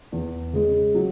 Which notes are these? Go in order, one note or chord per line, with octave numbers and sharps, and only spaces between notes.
E2
C#3 G#3
F#3